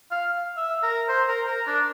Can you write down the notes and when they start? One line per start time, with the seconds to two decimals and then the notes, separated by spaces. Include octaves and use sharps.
0.11 F5
0.57 E5
0.83 A#4
1.09 C5
1.28 A#4
1.47 A#4
1.67 D4